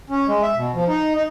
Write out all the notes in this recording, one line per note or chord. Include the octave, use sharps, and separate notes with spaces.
C#4
G#3
E5
B2
F3
D#4
D#4